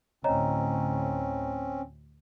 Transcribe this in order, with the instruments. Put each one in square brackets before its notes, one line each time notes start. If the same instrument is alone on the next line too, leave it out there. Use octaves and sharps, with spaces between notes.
[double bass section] D2 A2 [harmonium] C4 C#4 [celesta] C#5 D#5 A#5